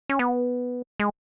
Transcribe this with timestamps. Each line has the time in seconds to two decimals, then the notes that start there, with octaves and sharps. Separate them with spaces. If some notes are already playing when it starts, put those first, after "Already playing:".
0.09 C#4
0.19 B3
1.00 G#3